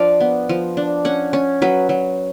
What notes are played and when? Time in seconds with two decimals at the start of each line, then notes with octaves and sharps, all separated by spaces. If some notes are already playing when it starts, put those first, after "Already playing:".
Already playing: F3 D4 D5 F5
0.20 B3
0.49 F3
0.77 D4
1.05 C#4 F#5
1.33 C#4
1.62 F#3 B4
1.89 F#3